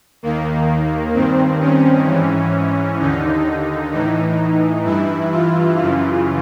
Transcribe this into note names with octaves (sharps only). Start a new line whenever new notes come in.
D#2 D#3 A#3
G2 D#3 C4
C#4
G#2 E3
D#2 D3 D#4
A2 E3 D#4
G2 E3 E4
F4
F#2 C#3 E3